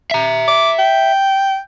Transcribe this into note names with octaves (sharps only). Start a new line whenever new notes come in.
E5 A#5
D6
G5